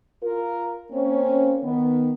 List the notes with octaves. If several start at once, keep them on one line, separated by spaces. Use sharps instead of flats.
F4 A#4
A#3 C4 C#4
D#3 B3